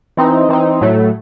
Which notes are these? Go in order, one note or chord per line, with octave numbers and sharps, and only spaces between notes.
E3 C4 D#4
E3 C4 D#4
A2 F#3 A3